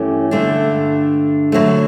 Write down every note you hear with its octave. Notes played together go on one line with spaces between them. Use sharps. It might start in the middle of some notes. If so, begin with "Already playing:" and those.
Already playing: G2 E3 A3 C#4 G4
G2 D3 A3 D4
D3 F#3 A3